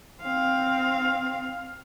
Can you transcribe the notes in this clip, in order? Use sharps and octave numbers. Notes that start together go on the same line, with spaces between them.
C4 F5